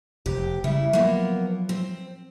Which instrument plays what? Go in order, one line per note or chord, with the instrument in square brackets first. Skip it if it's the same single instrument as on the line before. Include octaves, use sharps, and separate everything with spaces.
[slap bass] F1 [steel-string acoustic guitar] G4
[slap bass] C#3 G3 [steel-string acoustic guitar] E4
[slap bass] F3 F#3 [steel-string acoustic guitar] A#3 B3
[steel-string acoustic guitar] C4